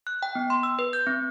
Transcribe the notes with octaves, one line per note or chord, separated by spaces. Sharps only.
F#6
G5
B3
C6
E6
B4
G6
C4